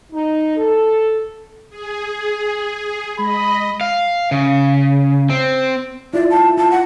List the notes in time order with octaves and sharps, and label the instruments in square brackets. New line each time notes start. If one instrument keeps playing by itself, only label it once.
[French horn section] D#4
A4
[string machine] G#4
[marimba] G#3 [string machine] D#5 [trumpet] B5
[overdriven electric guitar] F5
C#3
C4
[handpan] E4 F4 [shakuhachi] D5
[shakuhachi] A5
[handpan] F4 [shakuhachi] A5
[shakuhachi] F#5